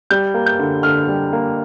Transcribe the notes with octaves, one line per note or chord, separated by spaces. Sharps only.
G3 G6
A#3
G6
D3
D3 F6
G3
A#3